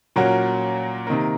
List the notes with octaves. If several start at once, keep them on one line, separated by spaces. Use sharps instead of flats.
A#2 F#3 A#3 C#4 F#4
C3 D#3 A#3